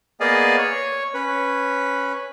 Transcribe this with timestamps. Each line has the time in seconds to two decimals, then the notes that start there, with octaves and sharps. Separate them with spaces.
0.20 A#3 B3 G#4 D5 D#5 F5
0.58 C#5
1.14 C#4 B4